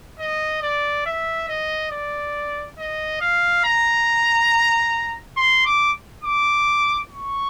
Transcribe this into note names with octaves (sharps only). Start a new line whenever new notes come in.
D#5
D5
E5
D#5
D5
D#5
F5
A#5
C6
D6
D6
C#6